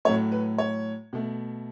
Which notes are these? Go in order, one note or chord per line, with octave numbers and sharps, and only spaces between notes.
A2 F#3 A3 C#5
B4
C#5
B2 A3